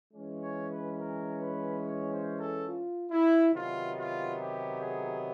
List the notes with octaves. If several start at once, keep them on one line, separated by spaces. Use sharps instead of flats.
E3 G#3 C#4
C#5
B4
A#4
B4
C#5
C5
A4
F4
E4
C3 D#3 F#3 B3 F4
F4
G4
G#4